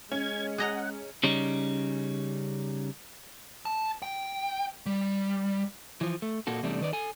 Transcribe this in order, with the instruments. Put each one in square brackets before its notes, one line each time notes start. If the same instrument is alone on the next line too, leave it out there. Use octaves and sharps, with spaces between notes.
[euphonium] G#3 [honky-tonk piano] C#4 [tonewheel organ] G#6
[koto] G#4 D#5 A#5 [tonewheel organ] F#5
[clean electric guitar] C#3 G3 C#4 D#4
[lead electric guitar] A5
G5
G3
[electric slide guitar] E3 F3
A3
A#2 A#3 F#4 A4
E2 C3 G3 A3 D4
D#3 B4 D5
A4 G#5